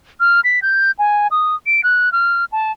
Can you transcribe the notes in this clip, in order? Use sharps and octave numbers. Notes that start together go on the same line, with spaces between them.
F6
B6
G6
G#5
D#6
D7
F#6
F6
A5